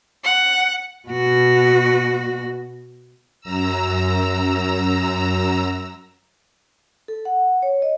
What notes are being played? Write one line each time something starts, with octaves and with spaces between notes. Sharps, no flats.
F#5
B2 F#4
F#2 A#5 E6
A4
F#5
C#5
D#5